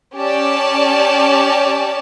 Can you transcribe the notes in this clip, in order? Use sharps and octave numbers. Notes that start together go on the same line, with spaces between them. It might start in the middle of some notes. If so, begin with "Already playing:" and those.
C#4 G4 D5 A5